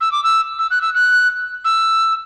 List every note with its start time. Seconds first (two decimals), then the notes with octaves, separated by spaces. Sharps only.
0.01 E6
0.12 D6
0.24 E6
0.59 E6
0.71 F#6
0.82 E6
0.95 F#6
1.65 E6